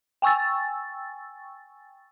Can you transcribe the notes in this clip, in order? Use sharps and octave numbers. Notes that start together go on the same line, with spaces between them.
G5 G#5 C#6 E6 A6